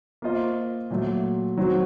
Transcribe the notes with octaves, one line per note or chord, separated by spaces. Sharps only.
A#3 F4 C5 D#5
A#2 F#3 A3
D#3 F#3 C4 F#4